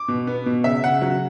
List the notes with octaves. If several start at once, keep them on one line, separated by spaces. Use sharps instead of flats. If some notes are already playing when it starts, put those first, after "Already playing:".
Already playing: D6
B2
B3
B2
C#3 E5
C#3 F#5
F#3